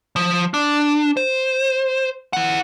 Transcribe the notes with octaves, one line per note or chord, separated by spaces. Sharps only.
F3
D4
C5
E4 F#5